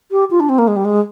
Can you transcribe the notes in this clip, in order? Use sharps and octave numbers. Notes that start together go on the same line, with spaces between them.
G4
F4
D4
C4
A#3
G#3
G3
G#3